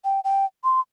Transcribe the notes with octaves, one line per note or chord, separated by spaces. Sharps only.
G5
G5
C6